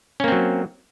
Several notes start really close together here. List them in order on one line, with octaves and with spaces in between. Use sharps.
C#4 A#3 C4 F#3